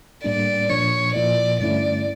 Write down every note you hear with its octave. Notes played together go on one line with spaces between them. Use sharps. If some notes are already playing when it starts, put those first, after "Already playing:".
A2 G3 A#3 D4 D5
A#2 F3 A#3 D4 C#5
A#2 F3 A#3 E4 D5
G2 D3 A3 C#4 E4 D5